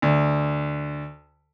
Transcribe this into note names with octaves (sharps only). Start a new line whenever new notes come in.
D2